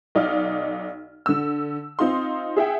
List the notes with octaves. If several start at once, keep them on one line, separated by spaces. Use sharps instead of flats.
B1 D#4 D5 F5 F6
D3 E6
C4 D#4 F4 C6
G#4 E5 F#5 G5